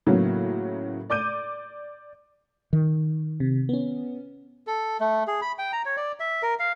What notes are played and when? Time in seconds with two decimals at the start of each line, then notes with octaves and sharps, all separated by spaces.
0.06 A2 C#3 F#3 A#3 B3
1.10 D5 D6 G6 D#7
2.73 D#3
3.40 C3
3.69 B3 C#4
4.67 A4
5.00 A3
5.28 G#4
5.42 B5
5.58 G5
5.73 A#5
5.86 C#5
5.97 D5
6.20 E5
6.43 A#4
6.59 F5